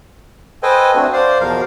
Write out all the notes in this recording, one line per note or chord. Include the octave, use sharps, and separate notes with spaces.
A4 B4 C5 D#5 G5 G#5
A3 C4 D4 F#4
C5 D5 F5
E2 B2 F3 A#4 F5